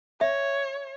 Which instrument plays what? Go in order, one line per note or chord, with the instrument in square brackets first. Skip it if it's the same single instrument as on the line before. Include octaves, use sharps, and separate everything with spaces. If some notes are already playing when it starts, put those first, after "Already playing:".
[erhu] C#5 [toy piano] E5